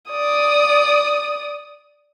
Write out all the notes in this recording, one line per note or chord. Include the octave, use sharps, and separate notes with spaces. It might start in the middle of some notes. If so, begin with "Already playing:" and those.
D5 D#6